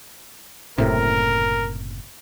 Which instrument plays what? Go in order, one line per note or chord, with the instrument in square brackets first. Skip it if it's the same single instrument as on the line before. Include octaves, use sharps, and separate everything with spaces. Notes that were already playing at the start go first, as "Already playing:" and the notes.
[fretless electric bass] F#1 A2 C3 [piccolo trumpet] A#4